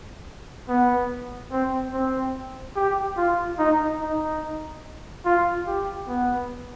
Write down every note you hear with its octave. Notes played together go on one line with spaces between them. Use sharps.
B3
C4
C4
G4
F4
D#4
D#4
F4
G4
B3